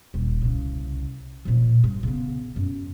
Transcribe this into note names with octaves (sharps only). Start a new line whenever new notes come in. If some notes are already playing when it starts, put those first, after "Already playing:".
D#1
C2 C#3
A#2 F3
G2
C#3 B3
F#2